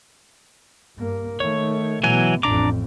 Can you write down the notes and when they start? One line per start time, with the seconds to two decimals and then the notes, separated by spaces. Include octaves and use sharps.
0.97 G2 A#3
1.40 D#3 A3 C#5
2.03 B2 E3 F#3 G#5
2.43 A1 F2 D4 A#5 D6